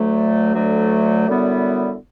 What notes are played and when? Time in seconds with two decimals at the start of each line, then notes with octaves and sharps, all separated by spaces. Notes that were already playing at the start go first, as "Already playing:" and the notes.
Already playing: D2 D3 F#3 A3
0.55 D2 D3 F#3 A3
1.27 F#2 D3 G3 B3 E4